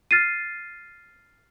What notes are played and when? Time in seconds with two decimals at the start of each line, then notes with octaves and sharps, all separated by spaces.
0.11 F6 A6 C7 D#7